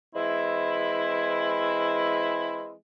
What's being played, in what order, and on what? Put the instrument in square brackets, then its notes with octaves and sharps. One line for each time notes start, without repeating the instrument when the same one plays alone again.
[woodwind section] E3 G#3 C4 E4